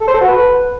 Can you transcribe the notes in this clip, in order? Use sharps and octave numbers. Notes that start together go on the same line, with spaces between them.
A4
C5
A4
F#4
B4